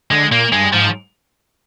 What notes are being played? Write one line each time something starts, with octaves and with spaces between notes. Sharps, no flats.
D3 G#3
A#2 A#3
G2 G#3
G#2 F3